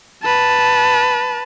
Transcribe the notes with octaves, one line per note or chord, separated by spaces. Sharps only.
B4 A5